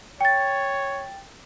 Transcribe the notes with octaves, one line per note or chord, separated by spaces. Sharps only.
C#5 G5 A6